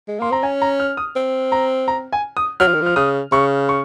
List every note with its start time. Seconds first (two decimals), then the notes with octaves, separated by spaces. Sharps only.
0.08 G#3
0.20 A#3 C6
0.31 C4 A#5
0.43 C#4 G#5
0.62 A#5
0.80 F6
0.97 D#6
1.16 C4
1.52 A#5
1.88 A#5
2.12 G#5
2.37 D#6
2.60 F#3 F6
2.68 F3
2.74 D#3
2.82 F3 F6
2.96 C#3 D#6
3.32 C#3 C#6
3.69 C#6